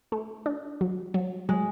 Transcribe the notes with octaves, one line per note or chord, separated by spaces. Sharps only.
A3
D4
F#3
F#3
F#3 G#3